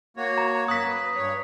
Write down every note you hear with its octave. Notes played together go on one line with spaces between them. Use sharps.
A#3 F#4 C#5
A#5
F#2 A#3 D#6 F#6 B6
B4
G2 C#5